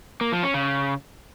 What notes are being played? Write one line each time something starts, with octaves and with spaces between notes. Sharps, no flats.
A#3
F3
C#4
C#3